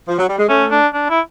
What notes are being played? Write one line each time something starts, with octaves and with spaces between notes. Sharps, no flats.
F3
F#3
G3
G#3
A3 C#4
D4
D4
E4